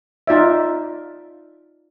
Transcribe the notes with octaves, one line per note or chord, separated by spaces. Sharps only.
D#4 F4 D5 E5